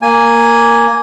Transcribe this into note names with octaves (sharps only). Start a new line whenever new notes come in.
A#3 G#5